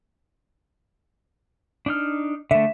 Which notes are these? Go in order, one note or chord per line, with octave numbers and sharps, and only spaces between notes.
D4 D#4 F6
D3 A3 E5